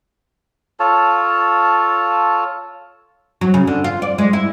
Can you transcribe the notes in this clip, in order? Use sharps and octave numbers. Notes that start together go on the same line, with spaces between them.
F4 A4 C#5 A5
F#3
C#3
D3
F4
D5
G#3
E4